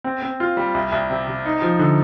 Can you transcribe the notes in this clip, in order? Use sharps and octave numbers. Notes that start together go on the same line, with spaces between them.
C4
C4
F4
G3
C2
C2
C3
C3
D#4
F3
D3